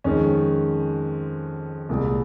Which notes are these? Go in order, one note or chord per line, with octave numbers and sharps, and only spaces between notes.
F2 D#3 G#3 C#4
C2 A#2 G#3